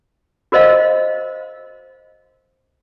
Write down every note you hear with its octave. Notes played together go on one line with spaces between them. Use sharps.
F#4 A#4 C5 D#5 F5